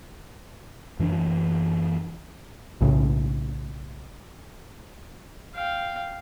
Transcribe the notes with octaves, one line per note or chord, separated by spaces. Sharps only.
F#2 E3 C4 D4
B1 A2 C#3
F5 G5